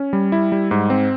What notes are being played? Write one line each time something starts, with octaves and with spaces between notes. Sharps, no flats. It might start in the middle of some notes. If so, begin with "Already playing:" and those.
Already playing: C#4
G3
E4
G3
G#2
C4